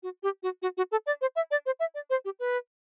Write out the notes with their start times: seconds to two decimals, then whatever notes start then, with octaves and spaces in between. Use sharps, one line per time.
0.03 F#4
0.23 G4
0.43 F#4
0.62 F#4
0.77 F#4
0.91 A4
1.06 D5
1.21 C5
1.36 E5
1.51 D5
1.66 C5
1.80 E5
1.94 D5
2.10 C5
2.25 G4
2.39 B4